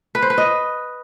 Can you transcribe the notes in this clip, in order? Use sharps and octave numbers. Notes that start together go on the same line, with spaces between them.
B4
C5
B4
D#5